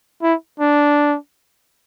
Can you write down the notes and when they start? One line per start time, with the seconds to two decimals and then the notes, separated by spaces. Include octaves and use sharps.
0.23 E4
0.60 D4